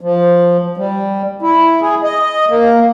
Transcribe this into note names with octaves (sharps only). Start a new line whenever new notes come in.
F3
G3
E4
G#4
D#5
A#3